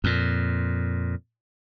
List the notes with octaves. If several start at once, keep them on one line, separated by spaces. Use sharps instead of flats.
F2 A#2